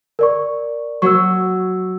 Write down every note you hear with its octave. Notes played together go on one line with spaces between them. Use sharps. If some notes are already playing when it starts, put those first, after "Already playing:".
A#4 D5 C#6
F#3 C#6 E6